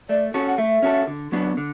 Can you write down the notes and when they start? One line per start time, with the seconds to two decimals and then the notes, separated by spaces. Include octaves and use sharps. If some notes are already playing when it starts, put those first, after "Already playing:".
0.09 A3 D5
0.34 C#4 F#4 A4
0.47 F#5
0.58 A3 E5
0.82 C#4 F#4 A4
1.07 D3
1.32 F#3 B3 D4
1.57 D3